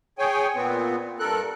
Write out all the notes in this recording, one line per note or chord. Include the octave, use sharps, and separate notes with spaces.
G#4 C#5 G5 G#5
A#2 B3 C4
G2 A4 A#4 F#6